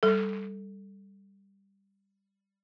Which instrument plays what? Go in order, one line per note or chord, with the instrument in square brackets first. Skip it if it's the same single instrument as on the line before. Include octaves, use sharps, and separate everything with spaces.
[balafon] G3 A4